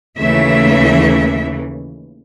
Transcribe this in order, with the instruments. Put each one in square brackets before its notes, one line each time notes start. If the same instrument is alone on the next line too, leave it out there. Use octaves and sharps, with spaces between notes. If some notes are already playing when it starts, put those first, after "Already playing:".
[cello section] D#2 C#3 E3 A3 E5